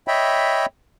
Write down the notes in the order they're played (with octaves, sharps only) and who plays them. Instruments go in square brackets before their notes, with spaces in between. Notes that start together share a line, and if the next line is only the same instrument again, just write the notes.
[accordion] C#5 D#5 E5 G5 B5